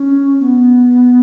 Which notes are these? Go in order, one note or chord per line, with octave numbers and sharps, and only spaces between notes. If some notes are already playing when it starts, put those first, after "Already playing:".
Already playing: C#4
B3